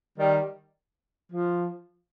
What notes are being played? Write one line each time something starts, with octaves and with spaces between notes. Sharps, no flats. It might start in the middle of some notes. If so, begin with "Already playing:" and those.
D#3 G3
F3